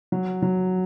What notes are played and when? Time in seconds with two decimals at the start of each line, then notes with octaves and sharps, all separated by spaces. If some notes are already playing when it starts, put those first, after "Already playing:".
0.12 F#3
0.42 F#3